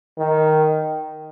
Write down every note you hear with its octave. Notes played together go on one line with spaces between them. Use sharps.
D#3